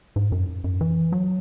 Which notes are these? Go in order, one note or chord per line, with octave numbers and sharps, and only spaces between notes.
G#2
F#2
F#2
E3
F#3